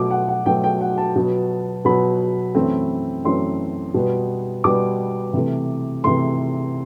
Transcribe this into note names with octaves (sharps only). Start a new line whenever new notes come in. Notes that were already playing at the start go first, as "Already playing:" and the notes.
Already playing: B2 F#3 A3 D6
F#5
F#5
B2 F#3 A3 G5
G5
F#5
A5
B2 F#3 B3
B2 F#3 B3 B5
F#2 E3 A3 C4
F#2 E3 A3 C4 C6
B2 G3 B3
B2 G3 B3 D6
C3 E3 A3
C3 E3 A3 C6